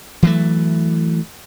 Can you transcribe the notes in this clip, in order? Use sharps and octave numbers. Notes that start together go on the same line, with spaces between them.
E3 F#3 A3